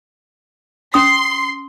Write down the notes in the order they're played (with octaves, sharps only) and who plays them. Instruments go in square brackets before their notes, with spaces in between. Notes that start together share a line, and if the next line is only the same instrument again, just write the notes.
[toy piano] C#4 D#6 [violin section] C6 C7